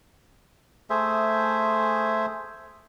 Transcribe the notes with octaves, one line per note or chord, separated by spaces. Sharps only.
A3 G#4 C5 E5